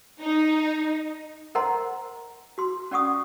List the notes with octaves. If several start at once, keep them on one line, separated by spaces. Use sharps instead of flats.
D#4
A#4 C5 D#5 F#5 A#5 C6
F#4 C6
C#4 D5 F#5 C#6 D#6